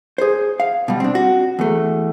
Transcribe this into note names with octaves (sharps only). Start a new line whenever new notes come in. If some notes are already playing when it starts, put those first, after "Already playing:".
G#4 C5
F5
B2 G3
C4 D4
F#4
E2 A3